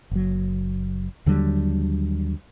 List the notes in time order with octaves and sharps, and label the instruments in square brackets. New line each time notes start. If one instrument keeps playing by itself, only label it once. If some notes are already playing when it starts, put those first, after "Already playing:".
[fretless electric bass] F#1 F#3
D#2 D3 F#3 G3